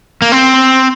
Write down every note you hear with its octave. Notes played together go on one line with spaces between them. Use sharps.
A#3
C4